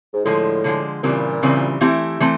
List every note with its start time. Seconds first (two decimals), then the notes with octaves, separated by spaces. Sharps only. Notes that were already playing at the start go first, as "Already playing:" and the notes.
0.13 G#2
0.25 A2 D3 F3 G#3
0.64 D3 F3 G#3
1.03 A#2 C#3 E3 G3 C4
1.43 C#3 E3 G3 C4
1.81 E3 A3 C4 E4 G4
2.20 E3 A3 C4